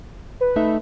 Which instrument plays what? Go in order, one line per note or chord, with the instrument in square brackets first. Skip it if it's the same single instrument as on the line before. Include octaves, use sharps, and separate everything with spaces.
[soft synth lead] B4
[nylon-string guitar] A3 D#4 E5